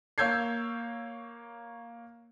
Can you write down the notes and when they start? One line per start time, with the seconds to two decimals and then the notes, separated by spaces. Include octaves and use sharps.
0.18 A#3 C#5 E6 G6 G#6 C7